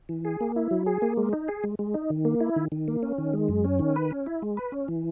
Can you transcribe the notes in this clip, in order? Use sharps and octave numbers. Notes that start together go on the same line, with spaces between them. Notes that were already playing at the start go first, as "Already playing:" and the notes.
E3
G#4
A#3
E4
F#3
G#4
A#3
G#3
D#4
G#4
G#3
G#3
D#4
D#3
A#3
E4
D#3
D#3
A#3
C#4
D#3
G#3
F#2
C#4
D#3
B4
C#4
E4
G#3
B4
C#4
E3